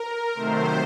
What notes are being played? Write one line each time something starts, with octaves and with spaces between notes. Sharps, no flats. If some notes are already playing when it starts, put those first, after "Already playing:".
Already playing: A#4
C3 D#3 F#3 A3 C5